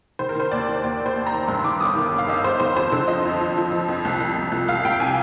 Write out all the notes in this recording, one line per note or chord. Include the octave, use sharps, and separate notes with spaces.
D#3 C5
A#4
D#3 C5
D#2 D5
D#3
D#2 D5
D#2
C5
D#2
A#5
D#3
G2 C6
D#3 D6
G1 D#6
D#3 D6
G1
F5
G1 D#5
G1 C5
D#3 C5
F2 C5
D3
F3 D#5
F2
F3
F3
F3
F2
C2
F3
C2
C2
C2 F5
C2 G5
C3 G#5